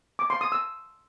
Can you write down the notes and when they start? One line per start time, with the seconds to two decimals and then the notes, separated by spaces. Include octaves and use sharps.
0.19 D6
0.30 C6
0.41 D#6
0.52 E6